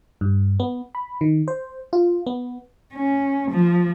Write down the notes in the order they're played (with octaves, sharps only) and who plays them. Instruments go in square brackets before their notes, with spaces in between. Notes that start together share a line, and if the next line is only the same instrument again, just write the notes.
[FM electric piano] G2
B3
B5
D#3
C5
F4
B3
[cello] C#4
F3